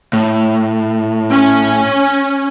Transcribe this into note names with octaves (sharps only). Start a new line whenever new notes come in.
A2
C#4